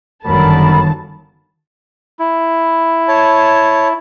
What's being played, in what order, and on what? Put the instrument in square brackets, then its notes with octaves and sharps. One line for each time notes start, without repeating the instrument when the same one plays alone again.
[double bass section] G1 F#2 [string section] D#3 A5 [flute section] A#4 B5
[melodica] E4
[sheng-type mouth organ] C#5 A5